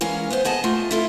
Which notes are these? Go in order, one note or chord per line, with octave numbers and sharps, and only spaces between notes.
E3 G#3 C#4 A#4 F5
B3 E4 C5
B3 G#4 D#5 A5
A3 F4
E4 F4 A4